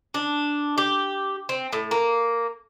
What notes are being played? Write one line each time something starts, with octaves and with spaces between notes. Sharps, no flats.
D4
G4
C4
A2
A#3